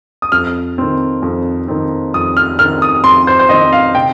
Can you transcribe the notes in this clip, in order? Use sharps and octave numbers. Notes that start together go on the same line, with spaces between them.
D#6
F2 F6
D#3 C4
F2
D#3 C4
F2 D#6
F6
D#3 C4 F6
D#6
F2 C6
C5
C5
D#3 C4 D#5
F5
C3 G5